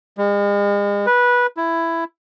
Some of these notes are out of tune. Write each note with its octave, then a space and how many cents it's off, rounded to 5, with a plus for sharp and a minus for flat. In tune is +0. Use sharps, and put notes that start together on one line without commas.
G#3 -40
B4 -15
E4 +10